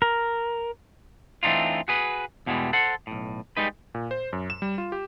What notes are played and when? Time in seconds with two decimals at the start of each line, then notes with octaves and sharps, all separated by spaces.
0.02 A#4
1.43 E3 A3 C4 D4 D#4 F4
1.88 F#4 G#4 B4
2.46 E2 B2 E3 F3 G3 G#3
2.73 A4 C5 F#5
3.07 B1 A2
3.57 G3 G#3 D#4 B4
3.95 A#2
4.11 C5
4.33 F#2
4.50 E7
4.62 G3
4.78 F4
4.92 G4